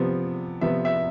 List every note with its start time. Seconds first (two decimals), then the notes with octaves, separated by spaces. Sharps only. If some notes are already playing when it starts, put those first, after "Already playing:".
Already playing: C3 F3 B3
0.61 C3 F3 B3 E5
0.85 E5